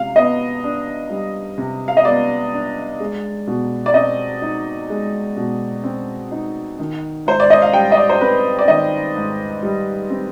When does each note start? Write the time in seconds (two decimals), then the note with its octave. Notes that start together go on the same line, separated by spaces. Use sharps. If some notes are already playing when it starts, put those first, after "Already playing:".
Already playing: C3 F5
0.16 B3 D#5
0.64 D4
1.10 G3
1.58 C3
1.88 F5
1.97 D#5
2.05 B3 D5
2.53 D4
3.00 G#3
3.47 B2
3.86 D5
3.94 C4 D#5
4.42 D#4
4.90 G#3
5.37 B2
5.83 C4
6.31 D#4
6.79 D#3
7.26 G#2 C5
7.40 D5
7.50 D#5
7.62 F5
7.73 G3 G5
7.92 D#5
7.97 D5
8.09 C5
8.21 C4 B4
8.59 D5
8.68 D#3 D#5
9.16 G#2
9.63 G3
10.10 C4